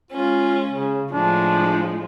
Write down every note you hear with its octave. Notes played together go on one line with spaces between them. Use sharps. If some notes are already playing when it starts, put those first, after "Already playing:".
G#3 C#4 F4
C#3
A2 F3 G#3 D4